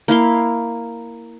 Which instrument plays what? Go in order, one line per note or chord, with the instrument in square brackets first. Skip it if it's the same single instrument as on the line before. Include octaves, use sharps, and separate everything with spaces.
[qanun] A#3 E4 F5 C6